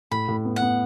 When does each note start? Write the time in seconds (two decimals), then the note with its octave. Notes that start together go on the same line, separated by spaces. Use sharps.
0.11 A2 B5
0.28 A2
0.45 B3
0.56 F#5
0.62 B3